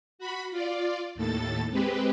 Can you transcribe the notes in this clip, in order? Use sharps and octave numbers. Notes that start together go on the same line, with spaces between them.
F#4 B5
F4 D5
D#2 A2 A4 A6
G#3 C4 G4 B4